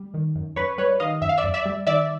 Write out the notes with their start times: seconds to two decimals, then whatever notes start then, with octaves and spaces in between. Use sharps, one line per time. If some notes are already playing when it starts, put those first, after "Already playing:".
Already playing: G3
0.14 D#3
0.36 F#2
0.56 F#2 B4 C#5
0.78 G3 B4 C#5
1.00 D#3 D#5 F5
1.22 F#2 E5
1.29 F5
1.38 D5 E5
1.44 F#2
1.54 D5 E5
1.66 G3
1.87 D#3 D5 E5